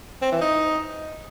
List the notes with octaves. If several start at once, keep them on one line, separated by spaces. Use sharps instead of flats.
C4
E3
D#4